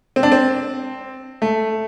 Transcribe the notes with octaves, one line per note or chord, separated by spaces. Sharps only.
C4
D4
C4
A3